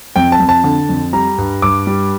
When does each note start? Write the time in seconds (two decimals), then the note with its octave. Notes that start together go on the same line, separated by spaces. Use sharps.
0.16 F2 G5
0.32 A5
0.40 F2
0.49 A5
0.64 D3
0.89 F2
1.13 G3 A#5
1.38 G2
1.62 G2 D6
1.87 G3